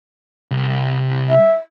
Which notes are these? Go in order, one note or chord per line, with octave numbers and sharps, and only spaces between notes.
C2
E5